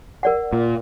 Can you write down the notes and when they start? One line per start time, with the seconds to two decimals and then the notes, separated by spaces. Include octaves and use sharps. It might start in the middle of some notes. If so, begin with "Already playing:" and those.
0.23 A#4 D5 F#5
0.53 A#2